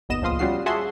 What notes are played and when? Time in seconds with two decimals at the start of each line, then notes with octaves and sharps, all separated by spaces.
0.09 G1 D#2 B3 D#5 E7
0.22 C#2 A#2 F3 F5 C6 D#6
0.39 G3 C#4 F4 F#4 F#5 C7
0.66 F#4 G#4 E5 F#5 A5 C6